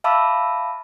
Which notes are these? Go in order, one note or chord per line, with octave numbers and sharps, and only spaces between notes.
E5 F5 A5 B5 D6 E6